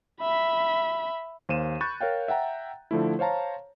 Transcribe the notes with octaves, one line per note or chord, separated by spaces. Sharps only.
E5 B5
D#2 C5 F5 D#7 E7
B5 C#6 F#6 G6 A6
A#4 C#5 F5 G5
E5 F#5 G5 A#5
D3 F3 A3 E4
C5 C#5 F5 A5 A#5